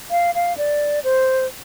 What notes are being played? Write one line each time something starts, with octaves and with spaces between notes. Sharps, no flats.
F5
F5
D5
C5